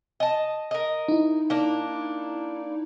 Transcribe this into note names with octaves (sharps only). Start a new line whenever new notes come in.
D#5 A5
A#4 D#5
D#4 E4
A#3 D4